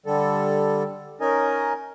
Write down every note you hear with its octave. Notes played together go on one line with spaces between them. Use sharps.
D3 G3 A4
C#4 D#4 A#4 D#5 G#5